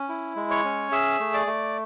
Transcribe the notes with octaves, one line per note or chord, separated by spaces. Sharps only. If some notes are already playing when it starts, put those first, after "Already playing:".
Already playing: C#4
E4
G#3
C#5 C#6
C#4
G#4 E5 E6
A3
D5 D6
A3